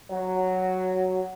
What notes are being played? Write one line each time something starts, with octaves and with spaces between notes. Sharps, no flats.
F#3